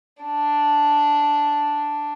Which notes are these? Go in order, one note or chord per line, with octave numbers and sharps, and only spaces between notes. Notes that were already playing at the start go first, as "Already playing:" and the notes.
D4